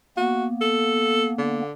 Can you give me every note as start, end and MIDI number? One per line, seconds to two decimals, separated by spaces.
0.17 1.61 58
0.17 1.61 59
0.17 0.46 66
0.61 1.30 69
1.38 1.72 50